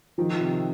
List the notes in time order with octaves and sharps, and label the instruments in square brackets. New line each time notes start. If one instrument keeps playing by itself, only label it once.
[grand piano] D#3 [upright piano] F3
[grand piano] C3